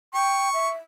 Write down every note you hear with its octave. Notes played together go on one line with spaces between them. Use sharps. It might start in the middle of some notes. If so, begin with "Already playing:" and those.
G5 C#6
E5